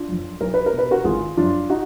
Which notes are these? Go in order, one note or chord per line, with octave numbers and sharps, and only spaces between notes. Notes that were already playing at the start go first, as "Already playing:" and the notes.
Already playing: D4 F4
F#2 F3
B1 A#4
B4
A#4
B2
B4
F#4 A#4
G#1 F4 G#4
F#2 F3 D4 F4
D#4 F#4